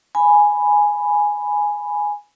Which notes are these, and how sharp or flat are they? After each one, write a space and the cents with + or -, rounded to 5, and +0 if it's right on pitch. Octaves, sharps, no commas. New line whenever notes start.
G#5 +0 B5 +0